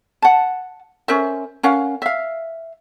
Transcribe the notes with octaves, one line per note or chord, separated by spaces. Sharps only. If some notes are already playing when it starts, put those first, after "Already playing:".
F#5 A5
C#4 A#4 C5 E5
C#4 A#4 F5 F#5
E5 F5